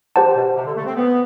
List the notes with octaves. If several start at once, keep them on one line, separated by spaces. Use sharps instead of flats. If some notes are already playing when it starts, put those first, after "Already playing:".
G4 C5 F#5 A5
B2
C3
D3
A3
C4
B3